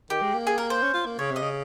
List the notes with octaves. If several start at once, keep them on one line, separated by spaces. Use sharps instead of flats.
D#3 G4
G#3
A#3
G#4
A#4
C5
C#4
F4
A#3
C#3 C#5
C3 D#5
C#3